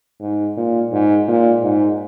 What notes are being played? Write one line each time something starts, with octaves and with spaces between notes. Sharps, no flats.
G#2
A#2
G#2
A#2
G#2